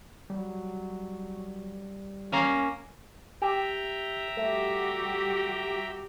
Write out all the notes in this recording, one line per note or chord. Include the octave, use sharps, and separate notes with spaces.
F#3 G3
A#3 C#4 F5 A#5
G4 E5 G5 A#5
G3 A3 F#4 G4